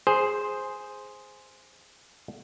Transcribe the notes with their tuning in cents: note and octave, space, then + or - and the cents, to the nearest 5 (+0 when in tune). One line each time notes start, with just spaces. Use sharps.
G#4 +0 C5 +0